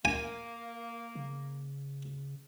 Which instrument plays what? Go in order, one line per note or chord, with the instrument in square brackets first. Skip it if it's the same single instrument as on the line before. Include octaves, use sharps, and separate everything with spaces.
[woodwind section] A#3 [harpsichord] G#5
[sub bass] C#3